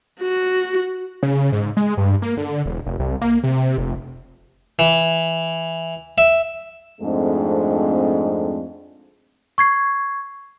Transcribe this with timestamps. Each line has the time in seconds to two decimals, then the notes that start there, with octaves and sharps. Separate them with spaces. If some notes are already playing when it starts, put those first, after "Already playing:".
0.21 F#4
1.23 C#3
1.52 G#2
1.77 G#3
1.97 G2
2.22 A#3
2.37 D3
2.66 E1
2.86 F1
2.99 C2
3.21 A#3
3.43 C3
3.78 F1
4.79 E3
6.18 E5
7.01 F2 G#2 G#3 A3 C4 D4
9.58 C#6 G#6 C7